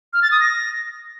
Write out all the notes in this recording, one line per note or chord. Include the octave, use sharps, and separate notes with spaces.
F6
A6
D#6
A#6